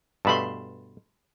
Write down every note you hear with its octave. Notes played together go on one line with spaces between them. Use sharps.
G2 B2 A3 A5 B5 C6